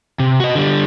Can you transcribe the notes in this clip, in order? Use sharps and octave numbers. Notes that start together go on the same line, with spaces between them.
C3
F#4 D#5
D3 G3